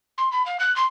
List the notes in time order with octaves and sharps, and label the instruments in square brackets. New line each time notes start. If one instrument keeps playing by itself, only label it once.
[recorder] C6
B5
F5
F#6
C6